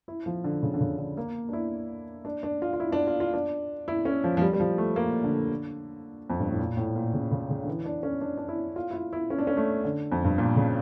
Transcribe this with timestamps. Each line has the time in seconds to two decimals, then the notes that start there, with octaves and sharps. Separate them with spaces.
0.08 E4
0.26 F3
0.44 D3
0.63 C#3
0.74 D3
0.81 C#3
0.98 D3
1.17 A#3
1.49 D4
1.53 E4
2.25 D4
2.43 D4
2.62 F4
2.73 F4
2.80 E4
2.92 D4
3.07 F4
3.20 F4
3.34 D4
3.88 E4
4.05 C#4
4.24 F3
4.37 F3
4.41 G3
4.53 G3
4.60 F3
4.78 A3
4.96 A#3
5.24 D3
6.30 F2
6.40 G2
6.50 A2
6.59 A#2
6.77 A2
6.96 A#2
7.14 C#3
7.31 C#3
7.50 C#3
7.63 D3
7.67 E3
7.85 D4
8.03 C#4
8.21 D4
8.37 D4
8.48 E4
8.76 F4
8.91 E4
8.94 F4
9.13 E4
9.30 C#4
9.38 D4
9.47 C#4
9.57 A3
9.84 D3
10.12 F2
10.24 G2
10.38 A#2
10.56 C#3